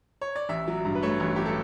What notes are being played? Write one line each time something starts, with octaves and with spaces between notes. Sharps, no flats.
C#5
D5
A1 E5
F#3
G2
B4
A3 C#5
A1
F#3 G4
A4